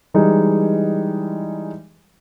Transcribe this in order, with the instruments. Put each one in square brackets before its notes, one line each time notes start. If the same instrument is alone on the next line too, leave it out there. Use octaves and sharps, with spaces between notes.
[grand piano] E3 G3 G#3 D#4